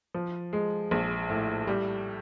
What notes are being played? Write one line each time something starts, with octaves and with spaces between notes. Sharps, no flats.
F3
G#3
A#1
A2
G3